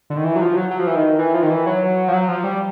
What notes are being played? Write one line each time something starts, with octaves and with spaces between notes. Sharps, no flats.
D3
D#3
E3
F#3
F3
F#3
F#3
F3
E3
D#3
E3
F3
D#3
E3
F#3
F3
F#3
F3
G3